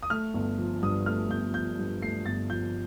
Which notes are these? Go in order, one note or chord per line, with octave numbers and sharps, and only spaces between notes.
D#6
A3 F6
G1
F3
G2 D#6
A3 F6
G1 G6
F3 G6
G2
A3 C7
G1 A6
F3 G6